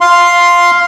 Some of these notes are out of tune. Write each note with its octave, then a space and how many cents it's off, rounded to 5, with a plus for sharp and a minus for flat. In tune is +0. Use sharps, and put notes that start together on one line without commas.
F5 +0 C6 +0